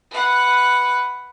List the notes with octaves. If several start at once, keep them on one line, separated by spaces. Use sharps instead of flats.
B4 F#5